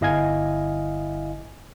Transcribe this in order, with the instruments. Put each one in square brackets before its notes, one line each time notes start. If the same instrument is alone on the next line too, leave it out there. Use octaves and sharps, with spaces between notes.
[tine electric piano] G1 E4 D#5 F5 G#5 G#6